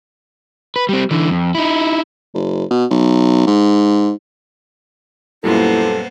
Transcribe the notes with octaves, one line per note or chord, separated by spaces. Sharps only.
B4
G3 C4
D3 E3
F2
D#4 E4
F#1
B2
B1
G#2
F#2 A#2 G3 A#3 B3 E4 A4 C5